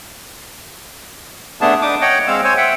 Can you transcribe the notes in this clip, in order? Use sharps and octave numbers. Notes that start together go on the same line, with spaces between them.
A3 B3 D4 G#4 A5
D4 D#4 D6 D#6
C#5 D#5 F#5 G5
G#3 C4 F5 E6
C5 C#5 G#5 E6
E5 F#5 G5